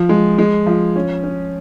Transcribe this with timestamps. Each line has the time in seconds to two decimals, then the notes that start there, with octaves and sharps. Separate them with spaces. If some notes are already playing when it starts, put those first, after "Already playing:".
Already playing: F3
0.09 G#3
0.38 G#3
0.66 F3
0.96 C#4
1.24 C#4